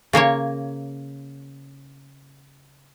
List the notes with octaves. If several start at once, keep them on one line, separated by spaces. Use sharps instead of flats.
C#3 A#3 A#4 C#5